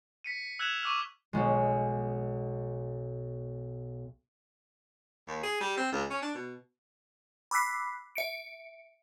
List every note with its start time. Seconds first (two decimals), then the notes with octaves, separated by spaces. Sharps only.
0.24 B6 C#7 D#7
0.59 E6 F#6 G#6 B6 E7 F7
0.82 C#6 D6 E6 F6
1.33 B1 G#3
5.28 D#2
5.43 G#4
5.61 G3
5.77 C4
5.92 C#2
6.10 C#4
6.22 D4
6.35 B2
7.51 B5 D6 E6 F#6 B6 C7
8.16 E5 C#7 D7